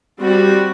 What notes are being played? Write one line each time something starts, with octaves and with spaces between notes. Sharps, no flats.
G3 C4 F#4